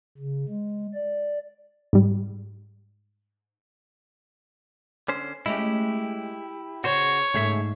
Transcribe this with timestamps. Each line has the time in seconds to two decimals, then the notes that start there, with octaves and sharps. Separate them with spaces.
0.18 C#3
0.48 G#3
0.94 D5
1.93 G#2 G3
5.08 D3 C#4 C5
5.46 G#3 A3 C#4 E4 G4
6.84 C#3 F#4 C5 C#5
7.34 G#2 C#3 A3 G#4 E5